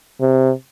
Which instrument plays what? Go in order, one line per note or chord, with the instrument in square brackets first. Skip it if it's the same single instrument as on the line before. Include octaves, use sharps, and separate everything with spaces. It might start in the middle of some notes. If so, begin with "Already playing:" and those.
[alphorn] C3